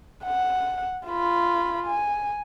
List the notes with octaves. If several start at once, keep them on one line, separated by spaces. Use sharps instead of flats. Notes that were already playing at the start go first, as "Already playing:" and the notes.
F#5
F4 B5
G#5